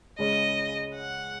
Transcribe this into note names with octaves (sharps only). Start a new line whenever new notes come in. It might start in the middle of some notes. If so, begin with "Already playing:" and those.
C#2 C#3 G#3 C#4 D#5
F#5